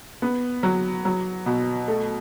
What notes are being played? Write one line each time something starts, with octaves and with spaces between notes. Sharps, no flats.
B3
F#3
F#3
B2
A3